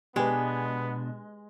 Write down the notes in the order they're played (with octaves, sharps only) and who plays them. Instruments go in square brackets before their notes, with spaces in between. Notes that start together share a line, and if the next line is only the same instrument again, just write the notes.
[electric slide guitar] B2 D4 [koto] G#3 [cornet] B3 [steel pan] G4 B4